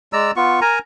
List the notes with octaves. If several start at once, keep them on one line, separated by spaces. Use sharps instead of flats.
G#3 D5 A#5 E6
B3 F4 C#6
A#4 G#5 A#5